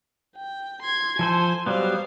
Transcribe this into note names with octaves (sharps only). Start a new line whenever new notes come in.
G5
C6 G#6
F3 A4 C5 G#5
F#3 G3 B3 C5 F5